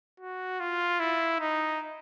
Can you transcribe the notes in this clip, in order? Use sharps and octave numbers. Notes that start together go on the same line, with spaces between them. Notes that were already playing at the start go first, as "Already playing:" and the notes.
F#4
F4
E4
D#4